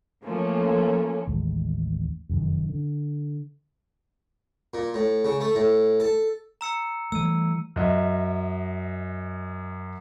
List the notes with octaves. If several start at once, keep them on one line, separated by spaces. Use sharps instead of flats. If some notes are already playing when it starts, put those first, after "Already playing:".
F3 A3 A#3 C#4
A1 D#2 G#3
F1 F#2 B2 D#3
D3
A#2
A2
C#3
A3
A2
A4
A#5 E6 C#7
E3 G3 A3 E6 D#7
F#2 D#5 E5